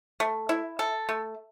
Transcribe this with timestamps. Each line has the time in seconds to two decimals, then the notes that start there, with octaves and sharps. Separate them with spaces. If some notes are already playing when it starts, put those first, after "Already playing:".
0.20 A3
0.49 E4
0.79 A4
1.09 A3